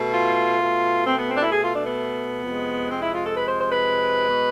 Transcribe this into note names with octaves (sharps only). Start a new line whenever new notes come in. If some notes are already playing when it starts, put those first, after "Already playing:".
Already playing: B2 A3
F4
B2 A3
C4
B3
C4
D4
E4
G#4
F4
D4
B3
F2 C3 G#3
C4
E4
F4
A4
B4
C5
C5
B4
B2 G#3